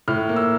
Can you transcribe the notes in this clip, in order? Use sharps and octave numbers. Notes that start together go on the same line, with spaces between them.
A2 F6
A#3
E6